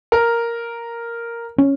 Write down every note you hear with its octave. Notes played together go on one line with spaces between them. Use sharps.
A#4
C#4